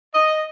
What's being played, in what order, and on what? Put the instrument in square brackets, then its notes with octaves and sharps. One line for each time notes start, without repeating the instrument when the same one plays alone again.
[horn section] D#5